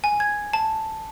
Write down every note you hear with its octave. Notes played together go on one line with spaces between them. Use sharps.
G#5
G#6
A5